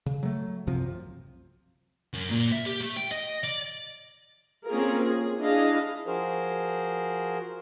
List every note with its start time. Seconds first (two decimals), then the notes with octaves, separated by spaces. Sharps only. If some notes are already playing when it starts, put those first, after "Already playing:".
0.06 C#3
0.23 F#3 A3
0.67 C2 F#2 C3 F3
2.14 F#2
2.31 A#2
2.52 E5
2.66 G4
2.80 A3
2.97 G5
3.11 D#5
3.44 D5
4.68 A#3 C4 C#4 F4 G#4 A#4
5.02 G#4
5.40 D4 E4 G#4 D#5 F5
6.07 F3 F#4 G#4 A#4 C5